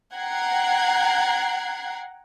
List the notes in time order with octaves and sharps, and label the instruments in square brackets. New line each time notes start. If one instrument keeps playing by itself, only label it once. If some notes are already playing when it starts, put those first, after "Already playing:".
[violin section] F#5 G5 A#5 F#6 G#6 C7